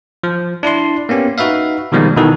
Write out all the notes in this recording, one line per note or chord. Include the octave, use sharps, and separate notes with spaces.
F3
D4 E4 D5 C6
A#3 B3 C#4 G4
D#4 F#4 B4 E5 F5
B2 D#3 F3 G3 G#3 A#3
B2 D#3 E3 D#4 F#4 A4